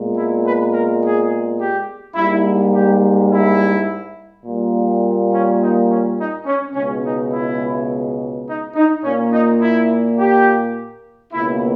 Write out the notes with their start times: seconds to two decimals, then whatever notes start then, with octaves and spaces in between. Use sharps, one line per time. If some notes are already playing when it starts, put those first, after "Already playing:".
Already playing: A#2 G#3 B3
0.14 E4
0.43 B4
0.71 A#4
1.01 G#4
1.58 G4
2.15 G#2 G3 A#3 E4
2.73 G4
3.29 E4
4.44 A#2 G3 A#3
5.30 C#4
5.59 D#4
5.88 C#4
6.16 D#4
6.46 C#4
6.73 C#2 B2 G#3 C#4
7.02 D#4
7.31 E4
8.46 D#4
8.75 D#4
9.03 A#2 C#4
9.08 A#3
9.32 D#4
9.61 E4
10.18 G4
11.33 C#2 B2 A#3 E4